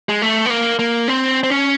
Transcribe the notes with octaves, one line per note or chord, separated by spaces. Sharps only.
G#3
A3
B3
A#3
A#3
C4
C4
C#4